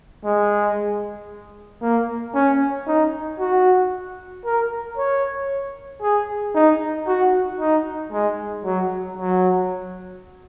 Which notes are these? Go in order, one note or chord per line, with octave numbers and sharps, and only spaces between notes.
G#3
A#3
C#4
D#4
F#4
A#4
C#5
G#4
D#4
F#4
D#4
G#3
F#3
F#3